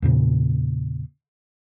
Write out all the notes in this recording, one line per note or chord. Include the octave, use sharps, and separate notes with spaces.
E2 A#2 C#3